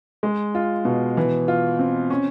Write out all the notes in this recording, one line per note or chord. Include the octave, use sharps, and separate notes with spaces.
G#3
F4
B2
E3
F4
C4
C#4